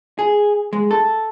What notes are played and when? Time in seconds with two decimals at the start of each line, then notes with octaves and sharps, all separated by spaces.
0.19 G#4
0.73 G#3
0.91 A4